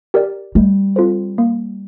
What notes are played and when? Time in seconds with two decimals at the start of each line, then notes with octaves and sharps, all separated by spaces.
0.14 G4 A#4 D5
0.55 G3 A3
0.96 C4 F4 A4 C5
1.38 A#3